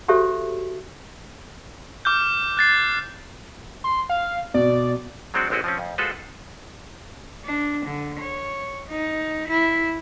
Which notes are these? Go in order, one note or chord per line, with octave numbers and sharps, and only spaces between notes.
F#4 G4 A4 C5 C#5 E5
D6 F6 G6
F#6 A6 C7
C6
F5
B2 D5
F#3 G#3 C4 D4 F#4
A1 G#3 C4 E4 F#4 D#5
F3 C4 C#4
F2
G#3 F4 F#4 A4 B4 C5
D4
D3
C#5
D#4
E4